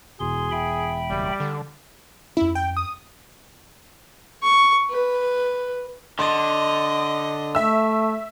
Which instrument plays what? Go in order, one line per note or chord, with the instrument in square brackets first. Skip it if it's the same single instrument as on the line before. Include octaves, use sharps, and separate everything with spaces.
[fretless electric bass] E1 E2 [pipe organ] B2 C6 [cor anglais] G#4
[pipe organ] E5 G5 B5
[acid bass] F#1 [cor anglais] G3
[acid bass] D3
[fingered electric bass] F2 C#4 [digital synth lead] E4
[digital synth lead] G5
D#6
[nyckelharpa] C#6
B4
[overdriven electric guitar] D3 [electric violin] D#5 [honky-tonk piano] C6
[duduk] A3 [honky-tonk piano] E5 E6